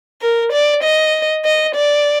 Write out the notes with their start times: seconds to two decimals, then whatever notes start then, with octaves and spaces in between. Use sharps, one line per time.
0.22 A#4
0.52 D5
0.83 D#5
1.45 D#5
1.75 D5